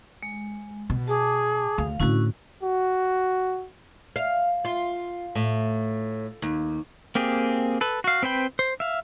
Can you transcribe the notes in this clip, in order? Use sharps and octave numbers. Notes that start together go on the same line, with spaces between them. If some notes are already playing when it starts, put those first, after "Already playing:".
G#3
B2
G#4 A5 D6
D2 F5
A2 D3 C#4 E4 F#4
F#4
F5
F4
A2
D#2
A#3 C4 G4 G#4
A4 B4
F#4 F5
C4 B4 C5 G5 B5
C5
E5 F5